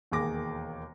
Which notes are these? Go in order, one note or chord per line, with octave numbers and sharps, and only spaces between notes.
E1 D#2 A#3 G#4 D6 A#6